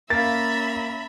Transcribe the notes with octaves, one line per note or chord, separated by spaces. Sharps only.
A#3 C#4 E5 F5 A#5 B5 A6